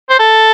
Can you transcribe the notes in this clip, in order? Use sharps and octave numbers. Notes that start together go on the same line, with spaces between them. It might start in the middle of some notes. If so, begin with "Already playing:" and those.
C5
A4